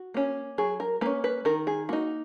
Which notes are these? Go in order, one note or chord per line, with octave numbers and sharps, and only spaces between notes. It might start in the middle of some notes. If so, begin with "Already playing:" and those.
Already playing: F#4
A#3 C#4
F#3 G#4
A#4
A#3 C#4 B4
B4
D#3 A#4
G#4
A#3 D#4 F#4